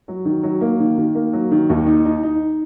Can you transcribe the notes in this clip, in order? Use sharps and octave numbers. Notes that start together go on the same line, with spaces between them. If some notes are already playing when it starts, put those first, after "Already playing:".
F#3
D#3
F#3
A#3
D#3
D#3
A#3
F#3
D#3
D#2
D#4
D#4
D#4